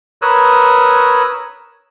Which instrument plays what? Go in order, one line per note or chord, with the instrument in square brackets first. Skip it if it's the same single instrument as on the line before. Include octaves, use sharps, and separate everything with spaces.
[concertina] A#4 B4 C#5 D#6 E6 F#6